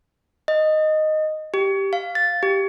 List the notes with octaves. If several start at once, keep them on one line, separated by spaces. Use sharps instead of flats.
D#5
G4
F5
A6
G4